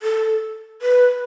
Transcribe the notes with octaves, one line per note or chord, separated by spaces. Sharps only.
A4
B4